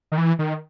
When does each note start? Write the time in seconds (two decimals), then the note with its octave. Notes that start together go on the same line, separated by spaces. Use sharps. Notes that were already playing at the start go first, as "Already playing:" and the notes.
0.12 D#3
0.18 E3
0.39 D#3